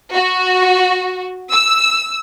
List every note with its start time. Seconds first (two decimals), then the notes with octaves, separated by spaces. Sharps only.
0.13 F#4
1.50 E6